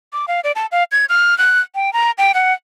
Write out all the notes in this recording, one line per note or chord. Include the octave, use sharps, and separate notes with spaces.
D6
F5
D5
A5
F5
G#6
F6
F#6
G5
A#5
G5
F#5